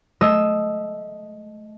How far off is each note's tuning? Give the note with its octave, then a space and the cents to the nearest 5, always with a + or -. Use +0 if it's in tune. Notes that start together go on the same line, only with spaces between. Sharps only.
A3 -25 D#5 +0 E6 +0